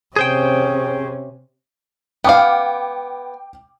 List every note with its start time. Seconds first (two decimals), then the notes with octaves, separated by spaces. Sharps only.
0.16 C3 C#4 G#4 C5 G5
2.24 B3 F5 G5 D6